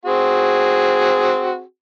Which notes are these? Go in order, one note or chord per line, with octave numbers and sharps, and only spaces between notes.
C4 F#4 G#4